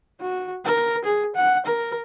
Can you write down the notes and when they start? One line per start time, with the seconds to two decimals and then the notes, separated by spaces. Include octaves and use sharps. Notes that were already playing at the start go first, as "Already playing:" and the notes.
0.21 F#4
0.65 A#4
1.04 G#4
1.35 F#5
1.66 A#4